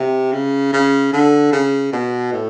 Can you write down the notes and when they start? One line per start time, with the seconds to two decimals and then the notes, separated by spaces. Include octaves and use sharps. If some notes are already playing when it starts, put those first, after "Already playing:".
Already playing: C3
0.32 C#3
0.73 C#3
1.13 D3
1.53 C#3
1.93 B2
2.33 A2